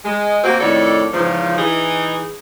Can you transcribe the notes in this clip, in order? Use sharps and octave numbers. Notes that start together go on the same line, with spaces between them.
G#3
A#3 C4 F#4
F2 A2 D#3 A4 C#5 D5
E2 G#2 C#3 F3
E3 D#4 G#4